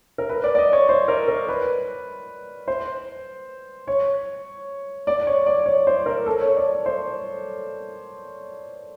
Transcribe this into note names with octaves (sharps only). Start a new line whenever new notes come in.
A#4
B4
D5
D5
D#5
C#5
C5
A#4
A#4
B4
C5
C#5
D5
C#5
D5
C#5
C5
A#4
A4
C#5
D5
C5